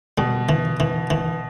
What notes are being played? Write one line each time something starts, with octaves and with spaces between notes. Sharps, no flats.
B2 G3
E3
E3
E3